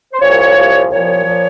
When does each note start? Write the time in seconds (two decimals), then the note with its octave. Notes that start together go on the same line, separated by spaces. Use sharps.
0.13 C5
0.21 C2 A#2 F3 C#5
0.55 C2 A#2 F3
0.90 C2 A#2 F3 C#5
1.24 A#2 F3